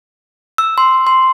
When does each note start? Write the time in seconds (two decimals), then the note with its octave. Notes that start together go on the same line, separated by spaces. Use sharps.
0.58 E6
0.78 C6
1.07 C6